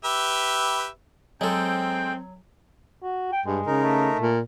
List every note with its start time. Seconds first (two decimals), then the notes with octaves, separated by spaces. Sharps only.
0.04 G4 B4 E5
1.41 F#3 G#3 C4 A4 G5
3.03 F#4
3.32 G5
3.46 G2 G#3
3.66 C#3 D#4 A#4
3.84 A3
4.20 A#2